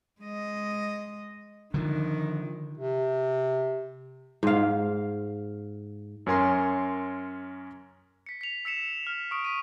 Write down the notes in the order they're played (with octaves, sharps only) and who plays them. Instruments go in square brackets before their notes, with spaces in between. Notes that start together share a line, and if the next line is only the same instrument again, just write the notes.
[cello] G#3 D#5
[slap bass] D3 F3 [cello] D#3
[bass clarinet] C3
[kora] G#2 F5
[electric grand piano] F#2 C#4 A#4 G#5 C6
[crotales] B6 C#7
B6 F7
E6 B6 C#7 E7
F6
C#6 D#6 D7
B6 D#7